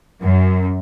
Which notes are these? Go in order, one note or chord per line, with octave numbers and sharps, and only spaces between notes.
F#2